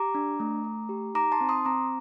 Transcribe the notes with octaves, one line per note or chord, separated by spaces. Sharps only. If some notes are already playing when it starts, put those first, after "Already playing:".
Already playing: G4 A#5 D6
D4
A3
A3
G4
D#4 A#5 D6
A5 C6
C4
C6 D#6
C4 A#5 D6